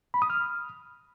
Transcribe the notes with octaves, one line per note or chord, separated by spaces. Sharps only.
B5
D#6
F6